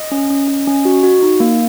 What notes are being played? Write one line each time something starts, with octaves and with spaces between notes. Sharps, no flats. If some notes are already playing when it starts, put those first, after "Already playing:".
Already playing: D#5
C#4
C#4
C#4
C#4
F#4
F#4
D#4
A#3